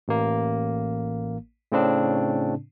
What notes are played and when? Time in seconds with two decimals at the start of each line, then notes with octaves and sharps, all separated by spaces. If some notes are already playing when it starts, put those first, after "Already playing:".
0.08 A1 A#3
1.72 A2 C#3 C4 D4